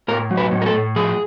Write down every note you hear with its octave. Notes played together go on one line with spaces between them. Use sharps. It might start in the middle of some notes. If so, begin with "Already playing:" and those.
A2 A#4
F#3
B4
A2
A#4
A4
A2
F3 G#4